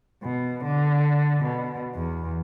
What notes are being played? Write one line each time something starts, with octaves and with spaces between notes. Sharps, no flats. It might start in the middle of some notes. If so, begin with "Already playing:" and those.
B2
D3
B2
E2